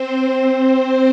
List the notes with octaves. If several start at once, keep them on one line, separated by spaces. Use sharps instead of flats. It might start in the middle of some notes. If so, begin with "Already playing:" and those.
Already playing: C4 C5